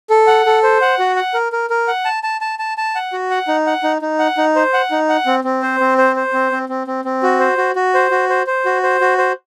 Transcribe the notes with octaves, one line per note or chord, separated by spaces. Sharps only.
A4
F#5
A4
C5
F#5
F#4
F#5
A#4
A#4
A#4
F#5
A5
A5
A5
A5
A5
F#5
F#4
F#5
D#4
F#5
D#4
D#4
F#5
D#4
C5
F#5
D#4
F#5
C4
C4
C5
C4
C5
C5
C4
C4
C4
C4
C4
F#4
C5
F#4
F#4
C5
F#4
C5
C5
F#4
C5
F#4
C5